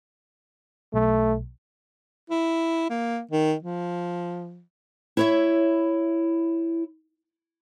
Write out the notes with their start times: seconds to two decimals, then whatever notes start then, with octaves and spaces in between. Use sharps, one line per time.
0.94 B1 A3
2.30 E4
2.90 A#3
3.31 D#3
3.63 F3
5.17 E4 C#5 E5